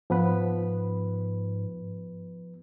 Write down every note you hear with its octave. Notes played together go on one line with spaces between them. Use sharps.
G#2 F3 B3 B4